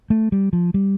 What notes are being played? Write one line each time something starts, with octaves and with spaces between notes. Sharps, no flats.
A3
G3
F3
G3